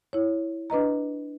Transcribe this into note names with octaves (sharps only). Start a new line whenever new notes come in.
E4 C#5
D4 B4 D#5 A#5